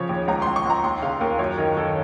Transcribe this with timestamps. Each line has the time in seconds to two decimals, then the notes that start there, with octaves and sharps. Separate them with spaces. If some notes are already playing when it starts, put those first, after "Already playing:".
Already playing: C#3 F3 C#5
0.09 D#2
0.28 C#2 A#5
0.42 C6
0.47 C#2
0.56 C#6
0.66 C#2 A#5
0.84 D#2 C6
1.02 C#3 F5
1.21 D#2 A#4
1.39 F#2 C#5
1.57 D#3 A#4
1.77 D#3 A4